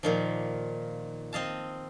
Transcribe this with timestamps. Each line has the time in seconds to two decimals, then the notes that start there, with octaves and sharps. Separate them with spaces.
0.03 A#2 D#3 F3
1.33 C4 D#5 F5 A5